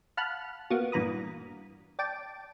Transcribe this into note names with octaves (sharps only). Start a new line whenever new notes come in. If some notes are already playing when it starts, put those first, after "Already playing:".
F5 F#5 A5 B5 F6 F#6
A#3 B3 F#4
G2 A#2 E3 A#5 B5 D#6
D5 G5 A5 D6